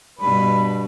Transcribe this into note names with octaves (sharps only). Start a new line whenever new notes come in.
G2 B2 B4